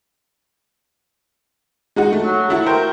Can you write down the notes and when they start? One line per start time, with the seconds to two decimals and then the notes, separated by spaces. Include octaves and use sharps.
1.96 G#3 D#4 F#4
2.13 A3
2.25 F#3
2.49 A3 E4 F#4
2.66 A#4 C5 G5